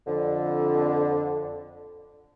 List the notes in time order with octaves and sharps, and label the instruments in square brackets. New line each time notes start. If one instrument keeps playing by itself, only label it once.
[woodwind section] F2 D3